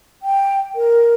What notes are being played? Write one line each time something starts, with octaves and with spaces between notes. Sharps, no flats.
G5
A#4